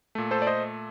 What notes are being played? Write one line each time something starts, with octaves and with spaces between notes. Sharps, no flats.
A#2 A3
A4 C5
D5
C5 D#5